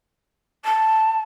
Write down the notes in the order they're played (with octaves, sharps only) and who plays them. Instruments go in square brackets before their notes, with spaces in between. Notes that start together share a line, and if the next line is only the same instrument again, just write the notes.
[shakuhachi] A5